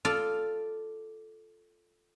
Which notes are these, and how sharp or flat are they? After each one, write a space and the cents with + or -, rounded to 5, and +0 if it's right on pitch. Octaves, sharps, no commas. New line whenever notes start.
F4 +0 A4 +0 D5 +0